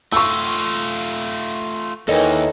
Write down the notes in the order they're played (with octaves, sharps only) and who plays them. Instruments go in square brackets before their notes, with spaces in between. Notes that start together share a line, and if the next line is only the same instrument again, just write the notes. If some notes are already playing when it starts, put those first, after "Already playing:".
[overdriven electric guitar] A3 F4 [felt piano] C#6 E6
[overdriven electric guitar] D#2 [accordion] D#3 E3 [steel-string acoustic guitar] A4 C#5 D#5